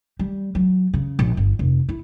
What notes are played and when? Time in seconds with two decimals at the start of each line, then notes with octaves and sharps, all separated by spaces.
0.19 G3
0.55 F#3
0.94 C#3
1.19 A#1
1.37 G1
1.59 F1
1.89 E4